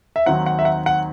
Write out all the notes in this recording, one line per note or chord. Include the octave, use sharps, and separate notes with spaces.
E5
D#2 D#3 F#3 C4 D#4 F#5
F#5
E5
F#5
F#5